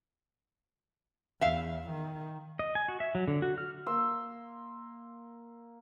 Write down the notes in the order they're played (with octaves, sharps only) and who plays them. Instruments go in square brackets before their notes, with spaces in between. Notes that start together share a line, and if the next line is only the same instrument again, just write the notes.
[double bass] E2 [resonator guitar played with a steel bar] E5 F5
[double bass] D#3
[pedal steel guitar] D#5
G#5
F#4
E5
F#3
D3
F#4
F6
[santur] A#3 C6 E6